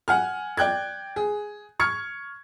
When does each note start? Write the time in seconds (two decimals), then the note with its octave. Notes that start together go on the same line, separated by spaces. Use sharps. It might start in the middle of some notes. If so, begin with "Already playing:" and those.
0.08 F#5 G#5 F6
0.57 D5 G5 F#6 G#6
1.16 G#4
1.80 C#6 F6 G#6 C#7